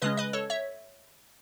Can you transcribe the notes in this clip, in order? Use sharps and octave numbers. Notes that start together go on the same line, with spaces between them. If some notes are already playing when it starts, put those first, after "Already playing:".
C#3 G#3 C#4 B4 D#5
B4 D#5
A4 C#5
C#5 E5